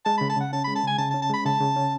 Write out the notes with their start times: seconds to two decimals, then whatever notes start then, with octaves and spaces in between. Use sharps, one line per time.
0.05 G#3 A5
0.18 C#3 B5
0.30 A5
0.36 C#3 F#5
0.53 C#4 A5
0.64 G#3 B5
0.75 A5
0.83 C#3 G#5
0.98 C#3 A5
1.11 A5
1.14 C#4
1.22 A5
1.30 G#3 B5
1.46 C#3 A5
1.60 C#3
1.76 C#4